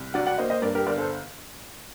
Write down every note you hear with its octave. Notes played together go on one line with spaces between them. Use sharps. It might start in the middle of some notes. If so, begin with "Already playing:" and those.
Already playing: C2
F#3 D5 F#5
D5 F#5
A#3 C5 D#5
C5 D#5
G2 A#4 D5
G4 A#4
G1 A#4 D5
A4 C5